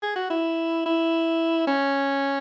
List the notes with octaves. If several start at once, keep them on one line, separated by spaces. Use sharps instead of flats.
G#4
F#4
E4
E4
C#4